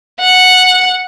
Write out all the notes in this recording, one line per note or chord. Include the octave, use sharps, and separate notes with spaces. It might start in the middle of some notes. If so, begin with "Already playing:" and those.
F#5